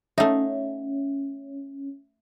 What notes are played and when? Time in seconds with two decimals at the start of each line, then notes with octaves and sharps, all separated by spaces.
0.18 A3 C#4 D#4 E5 F#5